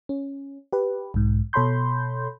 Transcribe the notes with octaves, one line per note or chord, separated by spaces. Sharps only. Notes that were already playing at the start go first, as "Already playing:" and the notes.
C#4
G4 B4
B1 G#2
B2 A4 C#5 B5 C6 G6